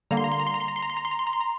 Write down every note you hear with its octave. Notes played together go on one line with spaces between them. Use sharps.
D3 G3 A#3 A#5
C6
A#5
C6
A#5
C6
A#5
C6
A#5
C6
A#5
C6
A#5
C6
A#5
C6
A#5
C6
A#5